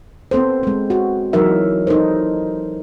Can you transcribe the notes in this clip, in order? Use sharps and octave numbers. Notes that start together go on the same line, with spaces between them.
B3 C4 A4 C5
G#3 C4
F#4
E3 F#3 D#4 A#4 E5
D#4 A4 A#4 C5